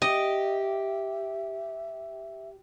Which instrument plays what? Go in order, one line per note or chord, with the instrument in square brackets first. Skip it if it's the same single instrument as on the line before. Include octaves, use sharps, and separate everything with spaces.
[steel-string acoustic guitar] G4 [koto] D#5 [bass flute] E5